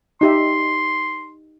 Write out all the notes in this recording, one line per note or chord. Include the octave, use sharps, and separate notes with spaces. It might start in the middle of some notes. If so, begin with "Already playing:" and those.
D#4 G4 E5 C6